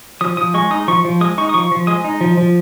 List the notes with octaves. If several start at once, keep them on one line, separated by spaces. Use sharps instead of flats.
F3 D#6
F3 D#6
G#3 C#6
D#4 D#6
F3 C#6
F3
G#3 D#6
D#4 C#6
D#6
F3 C#6
F3
G#3 D#6
D#4
F3
F3